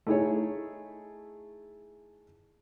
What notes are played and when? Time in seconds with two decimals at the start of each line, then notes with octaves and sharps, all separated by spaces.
0.07 A3 D#4 E4 G#4 C#5